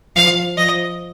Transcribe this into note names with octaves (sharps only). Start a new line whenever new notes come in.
F3 F5
F3 D#5